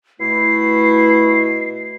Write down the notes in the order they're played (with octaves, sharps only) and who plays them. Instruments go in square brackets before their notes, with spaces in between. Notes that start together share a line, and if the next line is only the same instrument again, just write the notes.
[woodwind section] B2 A3 E4 [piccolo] C7